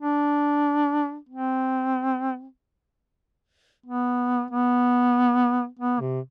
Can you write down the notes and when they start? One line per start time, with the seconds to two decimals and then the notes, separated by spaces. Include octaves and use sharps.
0.01 D4
1.29 C4
3.86 B3
4.51 B3
5.79 B3
6.00 C3